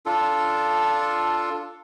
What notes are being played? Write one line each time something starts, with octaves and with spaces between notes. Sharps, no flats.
D4 F4 A4